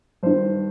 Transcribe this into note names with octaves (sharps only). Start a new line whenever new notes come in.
G2 D#3 C5